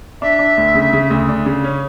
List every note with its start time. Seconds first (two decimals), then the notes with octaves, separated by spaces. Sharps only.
0.22 D4 E5
0.39 D4
0.57 D2
0.75 C#3
0.93 C#3
1.10 D2
1.29 D4
1.46 C#3
1.64 C#4